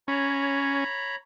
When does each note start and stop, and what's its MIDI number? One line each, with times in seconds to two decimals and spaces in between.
0.08 0.84 61
0.08 1.16 73
0.08 1.16 82
0.08 1.16 83